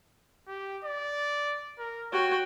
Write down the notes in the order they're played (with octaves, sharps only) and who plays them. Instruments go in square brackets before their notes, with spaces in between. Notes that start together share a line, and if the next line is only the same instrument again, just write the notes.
[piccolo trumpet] G4
D5
A#4
[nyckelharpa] F#4 G5 [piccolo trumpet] C#5